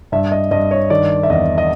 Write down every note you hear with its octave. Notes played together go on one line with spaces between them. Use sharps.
G2 E5
D#5
G2 D#5
C#5
D#3 D5
E5
E2 D#5
D#5